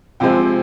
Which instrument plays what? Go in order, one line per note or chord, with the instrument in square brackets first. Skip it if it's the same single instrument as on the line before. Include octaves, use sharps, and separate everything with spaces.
[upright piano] C3 F3 G#3 C4 G5